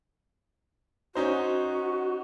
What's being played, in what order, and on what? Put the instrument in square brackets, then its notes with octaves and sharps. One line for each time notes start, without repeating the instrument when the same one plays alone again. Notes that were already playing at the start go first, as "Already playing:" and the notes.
[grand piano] C#4 D#4 C5 [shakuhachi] F#4